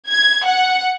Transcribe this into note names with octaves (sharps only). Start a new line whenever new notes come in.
G#6
F#5